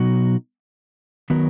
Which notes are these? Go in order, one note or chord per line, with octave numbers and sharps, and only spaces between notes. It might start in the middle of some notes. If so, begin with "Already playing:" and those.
Already playing: B2 F#3 B3 D#4 F#4
D#3 F#3 B3 F#4 A#4